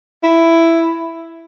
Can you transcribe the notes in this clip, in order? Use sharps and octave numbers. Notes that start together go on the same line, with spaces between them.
E4